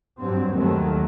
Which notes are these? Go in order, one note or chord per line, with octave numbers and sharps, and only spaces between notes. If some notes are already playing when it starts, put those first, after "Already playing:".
G2 F#3 C4
D#2 D#3 F#3 A3